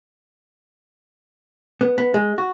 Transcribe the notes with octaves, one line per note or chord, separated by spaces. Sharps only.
B3
B3
G#3
F#4